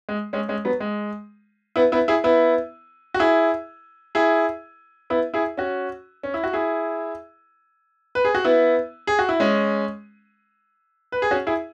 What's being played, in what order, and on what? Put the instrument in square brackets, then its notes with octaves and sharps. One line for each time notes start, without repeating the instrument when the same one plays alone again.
[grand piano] G#3
G#3 C#4
G#3 C#4
F#3 B3
G#3
B3 E4
B3 E4
E4 G#4
B3 E4
F#4
E4 G#4
E4 G#4
B3 E4
E4 G#4
C#4 F#4
C#4
E4
F#4
E4 G#4
B4
G#4
F#4
B3 E4
G#4
F#4
E4
G#3 C#4
B4
G#4
C#4 F#4
E4 G#4